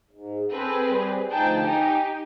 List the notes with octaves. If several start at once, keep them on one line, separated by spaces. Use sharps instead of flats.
G#2
C4 G#4 A4 B4
G3
D2 F3 D#4 G#4 G5 A5
D#4 G4 G5 G#5